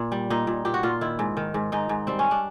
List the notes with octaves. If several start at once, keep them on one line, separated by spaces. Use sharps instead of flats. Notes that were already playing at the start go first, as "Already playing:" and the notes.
Already playing: A#2
G3
A#2 D#4
A#2
A#2 G4
F#4
A#2 F4
D#3 E4
G#2
D#3
G#2
G#2 D#4
G#2
G3 C4
C#4
D4